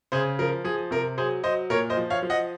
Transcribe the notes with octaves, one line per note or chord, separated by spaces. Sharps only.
C#3 G#4 C5
F3 A#4
F3 G#4
C3 A#4
F#3 G#4 C5
F#3 C5 D#5
A#2 A#4 C#5
C5 D#5
F3
C#5 F5
F3
D#5 F#5